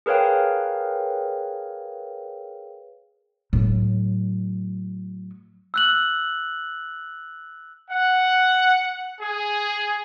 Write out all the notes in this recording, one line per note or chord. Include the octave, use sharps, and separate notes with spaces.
G#4 A#4 B4 C#5 F5 G5
A2 F#3
E6 F#6 F#7
F#5
G#4